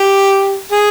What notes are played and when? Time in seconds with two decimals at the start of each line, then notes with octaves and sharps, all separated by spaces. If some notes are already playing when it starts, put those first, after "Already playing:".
Already playing: G4
0.72 G#4